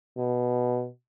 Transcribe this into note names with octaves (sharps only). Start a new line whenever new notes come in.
B2